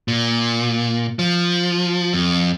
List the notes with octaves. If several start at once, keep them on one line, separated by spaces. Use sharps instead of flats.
A#2
F3
F2